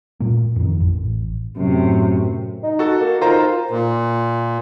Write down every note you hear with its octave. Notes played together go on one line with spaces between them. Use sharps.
A#2 A#3
F2 D#3
A1
F#2 A2 C3
D#4
F#4 A4
A#3
D#3 F4 C5 A#5
A#2